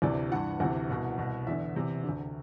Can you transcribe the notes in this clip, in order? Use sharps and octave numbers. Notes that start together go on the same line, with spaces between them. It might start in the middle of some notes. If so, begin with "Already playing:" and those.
D2 C3 E3 D5
G2 E3 F#5
D2 C3 E3 F#5
C2 B2
C2 B2
E2 D3 E5
E2 C3 E3
D3
D2